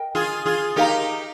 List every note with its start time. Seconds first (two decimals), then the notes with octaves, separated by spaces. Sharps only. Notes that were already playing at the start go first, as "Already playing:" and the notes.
Already playing: A#4 D#5 G5
0.15 F4 G#4
0.46 F4 G#4
0.76 D#4 G4 A#4 F5 A#5